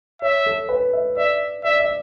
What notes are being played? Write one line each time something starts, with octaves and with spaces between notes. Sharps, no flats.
C#5 E5
A4
B4
E5
D5 E5
D5 E5
E5